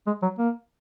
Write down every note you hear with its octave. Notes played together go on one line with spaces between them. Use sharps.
G#3
F#3
A#3